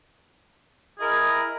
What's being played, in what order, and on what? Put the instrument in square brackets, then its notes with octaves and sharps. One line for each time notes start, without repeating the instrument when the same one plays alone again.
[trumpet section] E4 A#4 D#5 [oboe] G#4